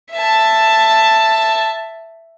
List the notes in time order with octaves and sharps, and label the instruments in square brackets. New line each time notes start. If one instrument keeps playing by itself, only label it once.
[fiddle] E5 A5